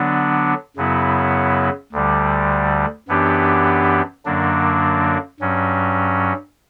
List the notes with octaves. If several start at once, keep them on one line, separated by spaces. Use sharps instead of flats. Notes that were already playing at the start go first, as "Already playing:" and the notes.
Already playing: D3 F#3 B3 D4
F#2 C#3 F#3 B3 E4
D2 D3 G3
F#2 E3 B3 D4 G4
F#2 D3 F#3 A#3 D4
G2 F#3 C#4